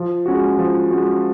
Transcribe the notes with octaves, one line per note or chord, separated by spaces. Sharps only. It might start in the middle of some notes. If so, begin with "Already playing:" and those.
Already playing: F3
G#3 C#4 F#4
F3
G#3 C#4 F#4